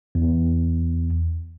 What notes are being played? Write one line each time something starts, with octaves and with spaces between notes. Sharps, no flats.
E2